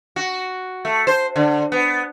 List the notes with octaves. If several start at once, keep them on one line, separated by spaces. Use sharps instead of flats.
F#4
A3
C5
D3
B3